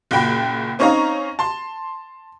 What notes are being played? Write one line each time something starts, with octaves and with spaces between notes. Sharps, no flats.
F#1 A#2 F#4 G5 B5
C4 C#4 D#4 C#5 F5 A#5
A5 C6